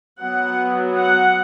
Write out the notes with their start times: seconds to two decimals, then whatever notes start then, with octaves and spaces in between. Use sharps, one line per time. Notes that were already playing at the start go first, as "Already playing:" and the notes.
0.19 F#3 B3 F#5
0.96 F#5